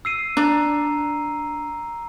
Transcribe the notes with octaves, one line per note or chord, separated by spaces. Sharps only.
E6 C7 D#7
D4 A#5